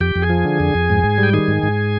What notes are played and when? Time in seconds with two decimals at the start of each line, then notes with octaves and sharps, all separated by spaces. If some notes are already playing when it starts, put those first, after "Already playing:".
0.01 F2 G4 G5
0.16 F2
0.22 G#4 G#5
0.30 F3
0.45 D3
0.60 F2
0.75 F2
0.90 G#2
1.04 G#2
1.18 G3
1.23 G5
1.33 D#3 G#4 G#5
1.48 G#2
1.63 G#2